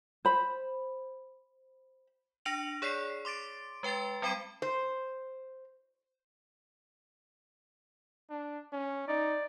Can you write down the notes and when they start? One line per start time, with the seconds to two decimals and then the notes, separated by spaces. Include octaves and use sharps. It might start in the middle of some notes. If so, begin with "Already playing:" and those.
0.25 C5 B5
2.45 D4 A#6 C#7 D7 F7 F#7
2.82 G#4 C#5 D5 B6 C7
3.25 C6 D6 A6 D7
3.83 G#3 B4 G5 C6 A6
4.22 G3 C4 G5 B5 D6 D#7
4.62 C5
8.30 D4
8.73 C#4
9.08 D#4 D5